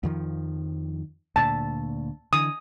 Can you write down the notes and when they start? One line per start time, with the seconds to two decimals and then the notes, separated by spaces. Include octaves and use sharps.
0.03 F2 D#3 F3
1.36 D2 A#2 A5
2.33 D3 E3 D#6